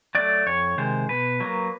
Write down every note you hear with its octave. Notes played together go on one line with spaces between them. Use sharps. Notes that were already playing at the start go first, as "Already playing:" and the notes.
F#3 A3 D5
F2 C#5
C3 D#3 G#3 C5
B2 B4
F#3 A#3